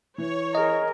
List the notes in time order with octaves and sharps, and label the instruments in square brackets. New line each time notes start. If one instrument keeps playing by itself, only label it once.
[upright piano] E3 [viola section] C#5
[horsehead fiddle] G#4 A#4 [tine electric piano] D#5